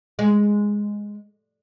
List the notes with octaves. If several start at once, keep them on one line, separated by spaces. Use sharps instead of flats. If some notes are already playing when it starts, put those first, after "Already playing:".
G#3